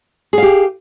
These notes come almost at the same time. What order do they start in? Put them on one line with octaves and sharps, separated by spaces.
G#4 F5 G4